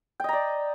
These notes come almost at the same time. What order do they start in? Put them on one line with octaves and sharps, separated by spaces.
G5 D#5 A#5 D5